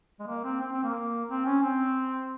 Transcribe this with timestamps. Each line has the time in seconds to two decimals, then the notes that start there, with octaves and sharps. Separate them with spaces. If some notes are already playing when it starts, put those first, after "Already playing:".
0.20 G#3
0.27 A#3
0.44 C4
0.61 C4
0.72 C4
0.83 A#3
1.29 C4
1.46 C#4
1.63 C4